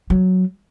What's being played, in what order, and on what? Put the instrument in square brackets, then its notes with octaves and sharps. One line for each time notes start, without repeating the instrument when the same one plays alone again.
[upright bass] F#3